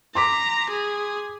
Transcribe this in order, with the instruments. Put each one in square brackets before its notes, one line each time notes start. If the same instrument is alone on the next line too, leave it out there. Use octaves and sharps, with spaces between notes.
[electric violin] A#5 [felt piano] C6 D6 B6
[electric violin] G#4